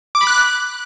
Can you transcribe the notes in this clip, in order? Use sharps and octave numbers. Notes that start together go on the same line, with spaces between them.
D6
B5
F#6